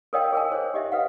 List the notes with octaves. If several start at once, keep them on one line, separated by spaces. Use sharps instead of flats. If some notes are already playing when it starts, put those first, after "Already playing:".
A4 A#4 C#5 D#5 F5 G5
G#4 A#4 G#5
C5 C#5
G4 D#5 E5
A4 B4 F5 F#5